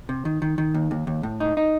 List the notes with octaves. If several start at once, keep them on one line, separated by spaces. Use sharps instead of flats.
C3
D#3
D#3
D#3
D#2
D#2
D#2
A2
D#4
D#4